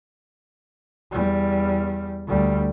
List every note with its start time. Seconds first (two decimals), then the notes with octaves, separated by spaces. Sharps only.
1.11 E2 G3
2.28 D2 G3